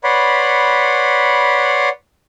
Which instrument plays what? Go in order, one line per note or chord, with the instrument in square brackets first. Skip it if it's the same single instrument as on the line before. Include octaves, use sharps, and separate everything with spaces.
[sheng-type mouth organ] B4 C#5 D5 F#5 B5 C6